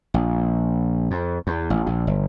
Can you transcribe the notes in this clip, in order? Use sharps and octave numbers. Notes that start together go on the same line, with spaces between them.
A#1
F2
E2
A1
A#1
G1